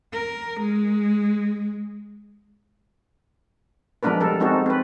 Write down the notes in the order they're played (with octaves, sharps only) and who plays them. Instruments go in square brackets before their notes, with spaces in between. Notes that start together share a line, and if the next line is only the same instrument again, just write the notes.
[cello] A#4
G#3
[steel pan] F3 G#3 B3 D4 A#4 B4
G3 A4 A#4
G#3 C4 D#4 F#4 A4
C4 B4